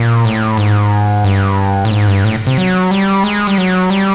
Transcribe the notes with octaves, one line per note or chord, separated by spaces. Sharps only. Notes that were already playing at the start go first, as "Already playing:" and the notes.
Already playing: A#2
A2
G#2
G2
A2
G#2
G2
A2
C3
F#3
G3
G#3
G3
F#3
G3